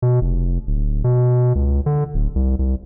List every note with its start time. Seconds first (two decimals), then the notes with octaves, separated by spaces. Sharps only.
0.02 B2
0.21 F1
0.67 D1
1.04 B2
1.55 C#2
1.86 D3
2.14 D1
2.35 C2
2.59 C2